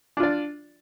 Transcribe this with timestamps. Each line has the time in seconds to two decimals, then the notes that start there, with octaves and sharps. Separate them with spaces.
0.17 D4
0.20 F4
0.23 D5